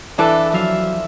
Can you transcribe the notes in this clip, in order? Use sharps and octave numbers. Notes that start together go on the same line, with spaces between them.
E3 D4 A4 E5 B5 D6
F3 F#3 A4 E5 F5